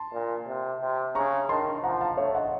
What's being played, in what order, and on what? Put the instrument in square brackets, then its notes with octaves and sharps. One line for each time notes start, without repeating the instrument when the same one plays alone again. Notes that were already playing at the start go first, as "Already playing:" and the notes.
Already playing: [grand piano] A5 C6
[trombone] A#2
C3
C3
[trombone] C#3 [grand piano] A#5 C#6
[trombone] D#3 [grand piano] A5 C6
[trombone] F3 [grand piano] F#5 A#5
[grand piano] F5 A5
[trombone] A3 [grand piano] C#5 F5
[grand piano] D#5 F#5